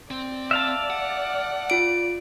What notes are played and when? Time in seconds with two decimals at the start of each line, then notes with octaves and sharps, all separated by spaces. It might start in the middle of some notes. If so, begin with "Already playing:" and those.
0.11 C4 D5
0.51 E5 F5 A5
0.90 F#5
1.70 F4 D7